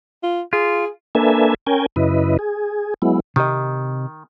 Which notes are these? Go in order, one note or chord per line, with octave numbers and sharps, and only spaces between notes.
F4
F4 G#4
A#3 D4 A4 B4 E5 G#5
C#4 A#4 G5 G#5
F#2 C#3 E4 B4 D#5
G#4
F#3 G#3 B3 E4
C3 D#3 G4 D#5